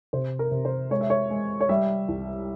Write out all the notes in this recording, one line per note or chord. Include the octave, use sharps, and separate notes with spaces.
C3 C5
A#4
C3
C5
G#3 C#5
E5
C#5
G#3
C#5
G3 E5
C2